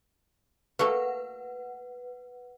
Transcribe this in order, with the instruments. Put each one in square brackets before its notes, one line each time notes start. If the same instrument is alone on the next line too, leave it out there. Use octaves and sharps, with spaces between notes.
[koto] A3 A#3 F#4 [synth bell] B4 F#5